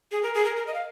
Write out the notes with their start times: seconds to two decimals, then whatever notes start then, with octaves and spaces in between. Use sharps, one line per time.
0.12 G#4
0.23 A#4
0.34 G#4
0.45 A#4
0.56 A#4
0.67 D#5
0.74 F5